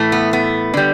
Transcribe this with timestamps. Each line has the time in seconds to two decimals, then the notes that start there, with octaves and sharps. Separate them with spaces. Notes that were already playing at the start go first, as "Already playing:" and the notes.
Already playing: A2 E3 A3
0.12 B3
0.33 B3
0.74 D3 G3